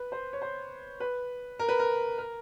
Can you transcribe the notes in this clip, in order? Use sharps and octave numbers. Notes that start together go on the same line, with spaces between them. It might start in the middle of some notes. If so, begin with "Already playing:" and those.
Already playing: B4
C5
C#5
C5
B4
A#4
B4
A#4
A#4